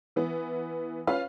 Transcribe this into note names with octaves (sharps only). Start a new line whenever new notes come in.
E3 B3
C#4 F4 B4 F5